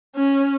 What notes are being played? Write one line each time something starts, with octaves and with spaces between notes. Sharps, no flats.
C#4